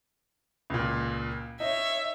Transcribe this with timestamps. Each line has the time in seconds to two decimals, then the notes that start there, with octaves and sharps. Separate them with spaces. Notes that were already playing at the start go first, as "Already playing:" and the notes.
0.70 C#2 A#2
1.60 D#4 C#5 E5